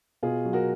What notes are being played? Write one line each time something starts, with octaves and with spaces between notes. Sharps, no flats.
B2 F4 G#4
F#3
F#4 A#4